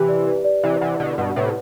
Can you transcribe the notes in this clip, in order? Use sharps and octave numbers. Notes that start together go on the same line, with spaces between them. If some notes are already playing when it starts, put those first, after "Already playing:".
Already playing: C3 E3 G4
D5
B4
D5
C3 E3 E4
C3 E3 F#5
B2 D3 D5
G2 B2 F#5
A2 C3 B4